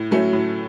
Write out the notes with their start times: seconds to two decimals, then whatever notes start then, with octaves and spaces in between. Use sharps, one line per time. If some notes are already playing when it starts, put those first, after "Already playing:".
Already playing: A2
0.11 F#3 A3 C#4
0.33 A2